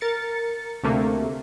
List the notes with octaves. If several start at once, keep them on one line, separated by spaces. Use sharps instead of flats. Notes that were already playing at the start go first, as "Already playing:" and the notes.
A#4 A6 C#7
D2 C3 A3 A#3